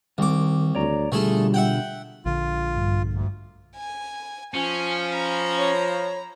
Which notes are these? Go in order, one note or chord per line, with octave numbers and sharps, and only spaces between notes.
C2 D#3 D6
D2 C#5 D5 A#5
B2 D3 G3 A3 F4 G#4 A4
E5 F#5 G5
A#1 D3 F4
G2
D2
G#5
F3 C#4 G#5
A#5 B5
C#5